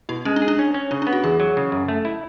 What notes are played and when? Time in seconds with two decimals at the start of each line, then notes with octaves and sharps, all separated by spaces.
0.09 B2 E4
0.25 G#3 C#4
0.36 D4
0.42 G#4
0.48 D4
0.59 C#4
0.74 C#4
0.91 C#3 D4
1.02 D4
1.07 B3
1.13 F#4
1.24 E2 G#4
1.40 F#3
1.57 C#3
1.72 F#2
1.88 A3
2.05 E4